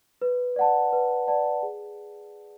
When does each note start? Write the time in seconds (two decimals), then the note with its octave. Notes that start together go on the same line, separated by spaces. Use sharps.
0.22 B4
0.56 D5 F#5 A5
0.93 B4
1.27 D5 F#5 A5
1.63 G#4